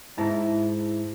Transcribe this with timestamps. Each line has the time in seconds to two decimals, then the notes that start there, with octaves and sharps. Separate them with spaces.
0.18 G#2 E4 A5 A#5